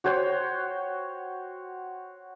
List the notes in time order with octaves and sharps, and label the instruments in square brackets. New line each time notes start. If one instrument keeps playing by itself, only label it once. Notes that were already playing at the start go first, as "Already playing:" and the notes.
[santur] F#4 C5 C#5 G5